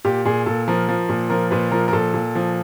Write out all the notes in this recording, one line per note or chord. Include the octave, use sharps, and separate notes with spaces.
A#2 G4
A#2 G#4
A#2 A4
F3 A#4
F3
A#2
F3 A#4
A#2 B4
F3 A#4
A#4
A#2 A4
A#2
F3